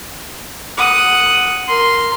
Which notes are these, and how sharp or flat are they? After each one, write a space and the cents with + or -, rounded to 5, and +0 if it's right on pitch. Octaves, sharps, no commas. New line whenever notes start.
F#5 +0 D#6 +0
A#4 +0 C6 +0